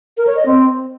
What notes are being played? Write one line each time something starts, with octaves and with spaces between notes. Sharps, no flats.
A#4
C#5
D#5
C4